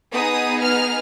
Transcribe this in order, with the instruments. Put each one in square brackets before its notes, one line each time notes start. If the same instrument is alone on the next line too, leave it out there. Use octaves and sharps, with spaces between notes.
[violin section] B3 D#4 G#4 D#6
F6